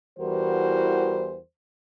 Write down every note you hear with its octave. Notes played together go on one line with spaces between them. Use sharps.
E2 E3 G3 F#4 A#4 C5